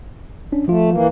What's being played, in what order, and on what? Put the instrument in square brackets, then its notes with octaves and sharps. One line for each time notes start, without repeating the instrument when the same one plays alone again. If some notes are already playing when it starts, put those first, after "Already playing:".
[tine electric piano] C#4 D4
[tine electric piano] F3 F4 [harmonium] A3
[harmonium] E3 A#3